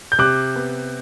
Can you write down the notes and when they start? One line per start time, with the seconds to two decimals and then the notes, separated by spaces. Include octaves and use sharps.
0.12 G6
0.19 C3 D6 F#6
0.56 B3